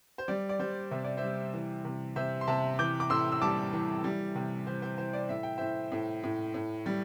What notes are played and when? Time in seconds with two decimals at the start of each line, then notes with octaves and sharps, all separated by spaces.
0.18 C5
0.28 G3 D5
0.49 D5
0.59 G3 C5
0.91 C3 E5
1.04 D5
1.17 G3 C5 E5
1.53 E3
1.85 C3
2.16 C3 C5 E5
2.41 C6
2.48 C3 E5 A5
2.79 E3 D6 G6
3.00 D6
3.10 A2 C6 E6
3.32 E6
3.41 G3 A5 D6
3.73 E3
4.04 G3
4.35 C3
4.67 E3 C5
4.82 C5
4.98 E3 C5
5.13 D5
5.29 A2 E5
5.43 G5
5.58 A2 C5 E5
5.92 A2
6.24 A2
6.54 A2
6.86 G3